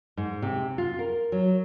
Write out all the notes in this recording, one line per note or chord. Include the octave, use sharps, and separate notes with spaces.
G#2
C3
F4
A#4
F#3